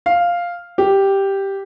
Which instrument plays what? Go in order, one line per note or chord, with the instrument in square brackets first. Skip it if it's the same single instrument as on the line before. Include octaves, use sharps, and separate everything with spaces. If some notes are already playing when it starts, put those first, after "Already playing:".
[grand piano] F5
G4